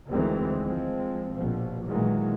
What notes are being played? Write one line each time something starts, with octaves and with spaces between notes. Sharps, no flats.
D2 D#3 E3 G#3 C4
F3 G#3 C4
A#1 B2 F3
A#2 D#3 E3 F#3 G#3